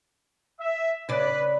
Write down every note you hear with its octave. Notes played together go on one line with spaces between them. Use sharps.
E5
C#3 B4 D5